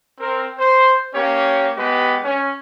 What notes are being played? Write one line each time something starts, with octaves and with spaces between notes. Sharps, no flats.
C4 A#4
C5
A#3 C#4 G4 C#5
G#3 B3 G4 B4
C#4